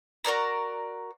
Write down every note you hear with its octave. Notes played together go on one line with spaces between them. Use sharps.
F#4 A#4 D5 A#5